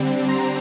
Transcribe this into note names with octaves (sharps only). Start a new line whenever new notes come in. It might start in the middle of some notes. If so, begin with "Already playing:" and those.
Already playing: D3 G3 C4
A#5 C6